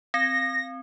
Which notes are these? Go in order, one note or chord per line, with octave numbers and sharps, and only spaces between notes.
C4 A#6